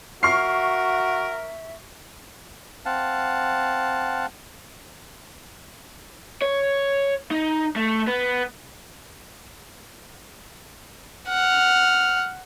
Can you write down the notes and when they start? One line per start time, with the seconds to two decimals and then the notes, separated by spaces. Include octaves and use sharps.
0.23 F#4 A#4 E5 C#6 F6 C7
2.86 C4 F5 F#5 A5
6.42 C#5
7.31 D#4
7.76 A3
8.07 B3
11.29 F#5 F6